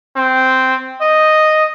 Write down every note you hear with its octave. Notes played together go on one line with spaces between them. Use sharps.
C4
D#5